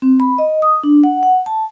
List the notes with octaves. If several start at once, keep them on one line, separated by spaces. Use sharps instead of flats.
C4
B5
D#5
D#6
D4
F#5
F#5
A5